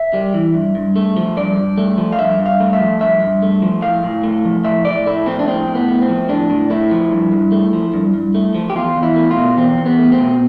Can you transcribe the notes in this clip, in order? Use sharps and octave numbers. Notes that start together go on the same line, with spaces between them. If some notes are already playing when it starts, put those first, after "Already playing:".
Already playing: E5
G3
E3
G2
G2
A3
F3
G2 D5
G2
A3
F3
F5
G2 E5
G2
F5
A3
E5
F3
G2 E5
G2
A3
F3
A2 F5
A2
A3
F3
A2 E5
A2 D5
A3 E4
F3 C4
D4
A2 C4
A2
B3
A3
C4
F3
A2 D4
A2
A3 E4
F3
G2
G2
A3
F3
G2
G2
A3
F3
G4
E2 F4
E2
E4
A3
F4
B2
E2 C4
E2
B3
A3
C4
B2